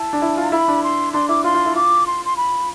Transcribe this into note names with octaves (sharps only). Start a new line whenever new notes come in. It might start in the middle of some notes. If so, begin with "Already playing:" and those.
Already playing: E4 A5
D4
E4
F4
E4 B5
D4
C6
D4 C6
E4 D6
F4 C6
F4
E4
F4 D6
C6
C6
B5